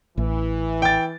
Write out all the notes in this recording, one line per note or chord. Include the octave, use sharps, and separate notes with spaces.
A1 E3
G5 A6